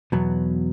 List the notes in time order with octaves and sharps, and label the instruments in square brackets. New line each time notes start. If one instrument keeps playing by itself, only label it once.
[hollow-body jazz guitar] E2 B2 F#3 B3